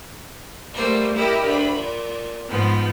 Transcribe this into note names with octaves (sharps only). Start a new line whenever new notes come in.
G3 A3 A#3 C5
E4 G4 A#4 D#5
D2 B5
A#2
G#2 F3 B3